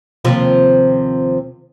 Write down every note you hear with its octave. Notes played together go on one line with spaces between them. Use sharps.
D#2 C3 F3